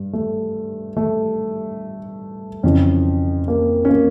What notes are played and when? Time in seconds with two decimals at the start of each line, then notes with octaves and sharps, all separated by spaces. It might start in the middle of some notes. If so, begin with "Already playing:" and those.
Already playing: G2
0.13 A3
0.97 A3
2.63 F2 C#3 E3 C#4
3.48 A#3
3.85 C#4
3.89 A#3